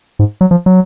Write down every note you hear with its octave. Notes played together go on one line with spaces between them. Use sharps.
G#2
F#3
F3
F#3